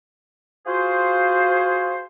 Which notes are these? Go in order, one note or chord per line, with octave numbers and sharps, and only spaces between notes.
F4 F#4 G#4 C5